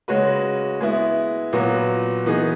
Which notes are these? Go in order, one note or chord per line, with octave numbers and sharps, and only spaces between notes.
C#3 G#3 C#4 F#4 B4
G#3 B3 E4
A#2 F#3 B3 F#4 B4
E3 B3 D#4 G#4